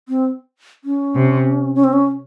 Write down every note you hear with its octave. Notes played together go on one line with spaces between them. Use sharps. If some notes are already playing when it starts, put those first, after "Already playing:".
C4
C#4
C3
C#4
C4
C#4